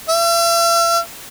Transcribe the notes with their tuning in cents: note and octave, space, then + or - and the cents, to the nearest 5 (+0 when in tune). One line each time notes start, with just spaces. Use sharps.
E5 +45